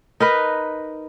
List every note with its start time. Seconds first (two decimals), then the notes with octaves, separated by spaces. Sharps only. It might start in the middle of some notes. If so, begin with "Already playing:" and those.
0.20 D#4 A#4 B4